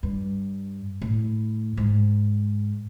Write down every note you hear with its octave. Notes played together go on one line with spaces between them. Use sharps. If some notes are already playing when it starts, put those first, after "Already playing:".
G2
A2
G#2